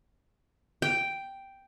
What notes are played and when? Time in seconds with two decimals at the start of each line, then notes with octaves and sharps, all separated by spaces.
0.82 G5